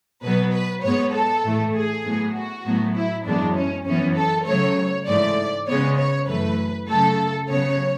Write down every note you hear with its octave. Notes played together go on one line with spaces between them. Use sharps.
B2 F#3 B3 B4
B4
G#2 G#3 B3 C#5
A4
A2 E3 A3
G#4
A2 F#3 B3
F#4
A2 F#3 B3
E4
F#2 E3 G#3 B3 D4
C#4
F#2 E3 B3 C#4
A4
C#3 F#3 A3 C#5
G#2 E3 A3 D5
C#3 G#3 B3 C#5
C#5
F#2 E3 A3 B4
C#3 F#3 A3 A4
C#3 F#3 B3 C#5